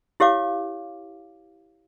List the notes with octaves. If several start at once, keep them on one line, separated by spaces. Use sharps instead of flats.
E4 G4 C#5 F5 D6